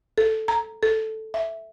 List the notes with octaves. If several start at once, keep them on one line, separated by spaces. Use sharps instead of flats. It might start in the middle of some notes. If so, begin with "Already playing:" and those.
A4
A#5
A4
E5